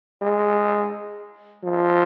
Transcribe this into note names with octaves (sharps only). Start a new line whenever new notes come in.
G#3
F3